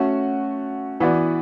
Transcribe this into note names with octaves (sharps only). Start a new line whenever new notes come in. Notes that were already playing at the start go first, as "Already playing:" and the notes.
Already playing: A3 C#4 F#4
E3 B3 F#4 B4 D5